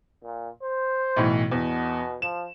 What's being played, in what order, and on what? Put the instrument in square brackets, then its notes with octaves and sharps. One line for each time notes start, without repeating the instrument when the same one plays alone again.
[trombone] A#2
C5
[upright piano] B1 A2 E3
[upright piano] E2 [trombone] B2
[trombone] F3 [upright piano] E7